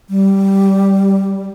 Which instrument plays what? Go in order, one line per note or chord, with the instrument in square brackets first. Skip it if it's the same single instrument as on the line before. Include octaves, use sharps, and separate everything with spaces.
[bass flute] G3